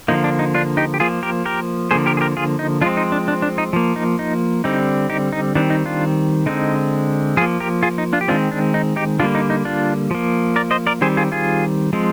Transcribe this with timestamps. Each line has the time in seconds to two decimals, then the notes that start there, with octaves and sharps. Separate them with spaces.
0.08 D3 F3 A#3 D#4
0.24 D4
0.39 D#4
0.54 D4 F4
0.77 D#4 G4
0.94 G4
1.00 F3 A#3 F4 G#4
1.23 G4 A#4
1.45 G4 A#4
1.91 D3 F3 A#3 G#4 C5
2.06 G4 A#4
2.17 G#4
2.21 G4 A#4
2.37 F4 G#4
2.59 D#4
2.81 F3 G#3 C4 D4 F4
2.97 D#4
3.12 D4
3.28 D4
3.42 D4
3.58 D#4
3.73 F3 A#3
3.96 D#4
4.19 D#4
4.64 D3 G3 C4 D#4
5.10 D#4 G4
5.33 D#4
5.55 D#3 G3 C4 D4
5.70 D#4
5.86 D4 F4
6.46 D3 G#3 C4 D#4
7.37 F3 F4 G#4
7.41 A#3
7.60 G4 A#4
7.83 F4 G#4
7.98 D#4
8.13 D4 F4
8.21 G4
8.28 D#3 G#3 C4 D4 F4
8.52 D4
8.74 D#4
8.96 D#4 G4
9.19 D3 G3 A#3 D4 F4
9.35 D#4
9.50 D#4
9.65 D4 F4
10.11 F3 A#3
10.56 A#4 D5
10.71 C5 D#5
10.87 A#4 D5
11.01 D#3 G3 C4 G#4 C5
11.17 F4 G#4
11.32 F4 G#4
11.93 F3 G#3 C4